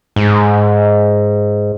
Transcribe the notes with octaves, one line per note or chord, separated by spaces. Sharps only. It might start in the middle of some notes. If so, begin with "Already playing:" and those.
G#2